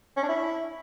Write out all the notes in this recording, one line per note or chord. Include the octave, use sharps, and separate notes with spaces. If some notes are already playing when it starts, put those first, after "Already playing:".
C#4
D4
E4